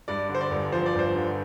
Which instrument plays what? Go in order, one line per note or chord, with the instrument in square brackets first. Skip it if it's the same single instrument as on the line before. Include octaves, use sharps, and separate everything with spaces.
[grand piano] G2 D5
D3
C5
D5
G1
F3 C5
D5
G1 C5
D3